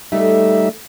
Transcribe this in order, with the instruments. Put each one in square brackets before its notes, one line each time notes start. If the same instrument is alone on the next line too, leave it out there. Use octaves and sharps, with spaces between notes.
[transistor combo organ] G3 D#4 E5 [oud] A3 A4